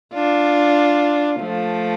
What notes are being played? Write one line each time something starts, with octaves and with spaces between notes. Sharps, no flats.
D4 F4
F3 A3